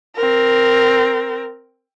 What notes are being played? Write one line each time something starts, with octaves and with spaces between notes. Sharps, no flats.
C4 A#4